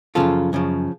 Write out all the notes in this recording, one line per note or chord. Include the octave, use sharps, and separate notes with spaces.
F#2 C#3 F3 F4 A4
F#2 C#3 F3